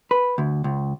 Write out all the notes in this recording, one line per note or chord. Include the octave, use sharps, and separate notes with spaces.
B4
D2
C#2